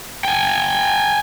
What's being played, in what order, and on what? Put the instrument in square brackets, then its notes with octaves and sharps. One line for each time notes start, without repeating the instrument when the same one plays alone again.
[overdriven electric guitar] G5 G#5